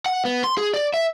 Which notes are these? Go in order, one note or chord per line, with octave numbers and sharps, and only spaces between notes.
F#5
B3
C6
G#4
D5
E5